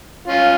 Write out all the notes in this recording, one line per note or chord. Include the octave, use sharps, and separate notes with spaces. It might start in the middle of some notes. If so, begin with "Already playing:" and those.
C#4 F4